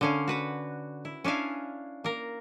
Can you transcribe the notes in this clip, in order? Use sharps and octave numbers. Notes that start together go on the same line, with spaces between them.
D3 C#4 F5
F#4 B4 F#5
E4
C#4 D4 E4 F5 G#5
A#3 A#4